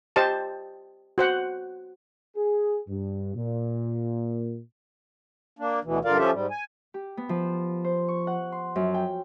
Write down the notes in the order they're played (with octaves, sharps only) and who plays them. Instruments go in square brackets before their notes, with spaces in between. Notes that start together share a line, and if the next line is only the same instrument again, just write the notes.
[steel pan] G4 C5 D#5 A5
F#4 C5 F#5
[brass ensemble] G#4
G2
A#2
[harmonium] A#3 D4
D2 B2 E3
G2 D3 F4 A#4 D5 F5
F3 C#4 F4 G4 A4 E5
G#2 G3
G#5
[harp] G4
B3
F3
C5
C#6
F#5
C6
F#2
G5